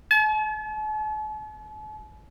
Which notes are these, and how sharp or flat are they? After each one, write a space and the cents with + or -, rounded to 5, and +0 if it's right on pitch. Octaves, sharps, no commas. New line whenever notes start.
A5 -45